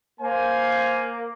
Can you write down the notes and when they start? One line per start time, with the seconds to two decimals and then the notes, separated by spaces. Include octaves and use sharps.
0.20 A#3 C5 F5 G#5